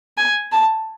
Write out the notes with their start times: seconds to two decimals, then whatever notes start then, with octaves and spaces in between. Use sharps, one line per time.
0.17 G#5
0.52 A5